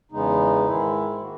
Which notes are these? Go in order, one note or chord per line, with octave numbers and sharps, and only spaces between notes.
E2 C#3 G#3 B3 D#4
G#2 D#3 G#3 E4
D#3 A#3 F#4